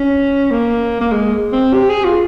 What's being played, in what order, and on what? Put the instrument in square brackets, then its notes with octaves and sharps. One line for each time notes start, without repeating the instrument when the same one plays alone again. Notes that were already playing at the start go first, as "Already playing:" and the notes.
Already playing: [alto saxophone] C#4
A#3
A#3
G#3
C4
G4
G#4
F4